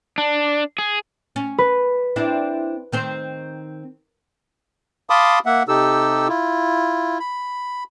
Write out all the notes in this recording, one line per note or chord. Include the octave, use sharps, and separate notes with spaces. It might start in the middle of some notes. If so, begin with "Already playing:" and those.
D4
G#4
C#4
B4
C4 D4 E4
D#3 C4 C5
F5 A5 B5 C6 D6 D#6
A#3 E5 F#5
C3 D#4 G4 A4 E6
E4 F4
B5